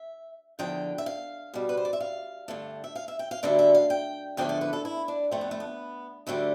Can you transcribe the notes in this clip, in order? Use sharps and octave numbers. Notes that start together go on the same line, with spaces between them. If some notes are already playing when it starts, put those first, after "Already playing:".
Already playing: E5
E2 D3 F3 G5
E5
F5
B2 G3
B4
C5
D5
E5
F5
G2 D3 A3
E5
F5
E5
G5
F5
D2 D3 G3 E5
E5
F5
G5
E2 D3 F3 A3 G5
D5
B4
A4
E4
D4
F2 D3 A3 C4
B3
A3
B3
D2 D3 G3 A3